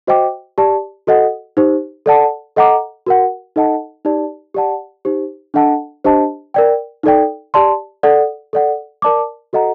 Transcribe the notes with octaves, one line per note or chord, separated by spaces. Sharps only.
F#4 C5 D#5 G5 D6
G4 D5 A5
F#4 A4 D#5 F#5
D#4 G4 C5
A4 D5 F#5 A5
A4 D#5 F#5 A#5 D6
F#4 A#4 F#5
D#4 A4 D#5 F#5 A5
D#4 G4 D5 A5
G4 D5 F#5 A5
D#4 G4 C5
D4 A4 D#5 F#5 A5
D4 G4 C5 D#5 A5
A#4 D5 G5
D#4 A4 D5 G5
G4 D5 A5 C6
A4 D5 F#5
A4 D5 F#5
A#4 D5 A5 D6
F#4 A4 D#5 F#5 A#5